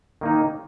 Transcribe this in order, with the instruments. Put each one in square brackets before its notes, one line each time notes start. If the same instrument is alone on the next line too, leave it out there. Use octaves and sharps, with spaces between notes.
[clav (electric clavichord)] D#3 A#3 D#4